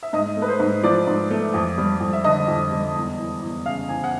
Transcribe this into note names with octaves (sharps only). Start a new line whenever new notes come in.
E5
G#2 D#5
A3
B4
C5
G#2
F3 D5
G#2
A3
F2
G3
F2
E5
D3 D#5
F2
G3
E2
E3
E2
C#3 F5
E2 G#5
F#5